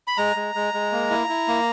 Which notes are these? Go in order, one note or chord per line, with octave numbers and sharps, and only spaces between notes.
B5
G#3 A#5
G#3
G#3
G#3
A#3
E4
E4
A#3